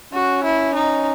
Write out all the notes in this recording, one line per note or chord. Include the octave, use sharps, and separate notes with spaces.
C#4 F#4
E4
D#4